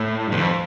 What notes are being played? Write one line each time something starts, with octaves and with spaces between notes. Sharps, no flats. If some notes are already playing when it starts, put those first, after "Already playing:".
Already playing: A2
G2
E2
F2